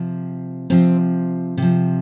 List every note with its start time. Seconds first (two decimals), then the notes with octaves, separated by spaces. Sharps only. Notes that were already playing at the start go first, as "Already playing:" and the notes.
Already playing: C3 F3
0.70 C3 F3 C4
1.57 C3 F3